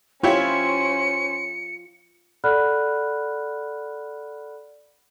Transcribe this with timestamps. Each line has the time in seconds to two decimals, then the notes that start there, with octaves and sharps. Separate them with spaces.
0.24 C#4 E4 F4 G4 C5 C#5 C#7
2.44 A4 D5 F#5 B5 F6 F#6